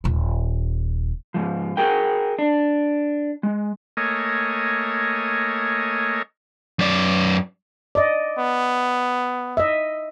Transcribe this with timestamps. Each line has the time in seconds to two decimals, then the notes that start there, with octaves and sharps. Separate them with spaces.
0.04 D#1 F4
1.34 G#2 F3
1.77 F#4 G#4 A#4 G5
2.39 D4
3.43 G#3
3.97 A3 A#3 C#5 D#5 G#5
6.79 F#2 D5
7.95 D5 D#5
8.38 B3
9.57 D#5 E5